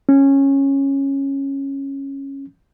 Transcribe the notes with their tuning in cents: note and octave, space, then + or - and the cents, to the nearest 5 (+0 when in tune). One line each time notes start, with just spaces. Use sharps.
C#4 -10